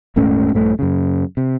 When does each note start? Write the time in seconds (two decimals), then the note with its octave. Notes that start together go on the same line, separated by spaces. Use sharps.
0.16 D#1 G#2 A3 C#4
0.53 A#1 G2 A3
0.79 F#2 C#3
1.37 C3